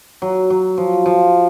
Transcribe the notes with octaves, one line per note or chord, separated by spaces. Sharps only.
F#3
F#3
F3
F3